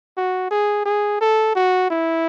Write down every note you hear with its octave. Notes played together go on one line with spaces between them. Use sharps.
F#4
G#4
G#4
A4
F#4
E4